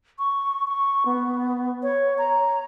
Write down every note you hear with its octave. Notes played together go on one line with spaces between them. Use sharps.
C#6
C#6
B3
C#5
A#5